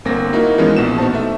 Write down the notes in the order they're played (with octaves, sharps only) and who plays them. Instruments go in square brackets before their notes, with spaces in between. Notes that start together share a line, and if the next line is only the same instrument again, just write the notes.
[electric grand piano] G1 A#3 C4 A#6
A#3 D#4 E4 F#4 A#4
E3 F3 G#3 A#3 B3 C#4
A#1 B2 E7
B3 D#4 F#4 C5 A5
A3 E5